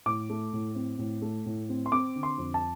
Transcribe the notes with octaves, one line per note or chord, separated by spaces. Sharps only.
A2 D6
A3
A2
C4
A2
A3
A2
C4
C6
C4 D6
D3
C6
F2
A5